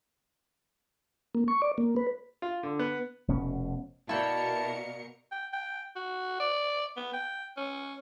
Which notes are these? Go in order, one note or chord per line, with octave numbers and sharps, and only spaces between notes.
A#3
C#6
D5
A#3
B4
F4
D3
B3
F1 B2 B3 C#4
B2 E4 A#4 D5 F5 G5 A5 C#7
G5
G5
F#4
D5
B3
G5
C#4